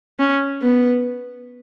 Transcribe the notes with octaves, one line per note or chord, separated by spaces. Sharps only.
C#4
B3